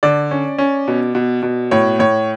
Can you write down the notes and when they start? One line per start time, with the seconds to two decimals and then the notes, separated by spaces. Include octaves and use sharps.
0.03 D3 D5
0.31 C#4
0.58 C#4
0.88 B2
1.15 B2
1.43 B2
1.71 A2 C#5
1.99 A2 C#5